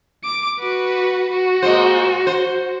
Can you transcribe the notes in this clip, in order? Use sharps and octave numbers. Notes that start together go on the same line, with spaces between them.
D6 D7
F#4 B4
F#4
A#2 G#3 C5
C5